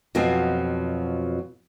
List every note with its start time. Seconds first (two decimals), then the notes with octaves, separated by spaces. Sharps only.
0.15 F2 B2 F3 F#3 G#5